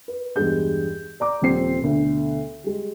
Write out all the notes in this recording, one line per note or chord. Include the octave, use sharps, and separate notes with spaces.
B4
E2 G2 G#3 G#4 G6
D5 A#5 D6
D#1 F3 G3 C4 C7
D2 B2
G3 G#3